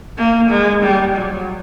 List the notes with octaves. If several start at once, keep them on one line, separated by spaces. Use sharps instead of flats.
A#3
G#3
G3
F#3